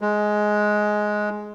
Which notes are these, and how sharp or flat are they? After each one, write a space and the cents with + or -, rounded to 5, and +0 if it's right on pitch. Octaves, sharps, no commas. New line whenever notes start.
G#3 +10